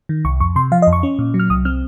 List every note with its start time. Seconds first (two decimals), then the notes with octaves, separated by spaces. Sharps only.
0.09 D#3
0.25 C2 C#6
0.40 F2 C#6
0.56 C3 C6
0.72 F3 F5
0.82 D#5
0.87 F2
0.93 C#6
1.03 C#4
1.19 A#2
1.34 F#3
1.40 F6
1.50 C2 D#6
1.65 C4 F6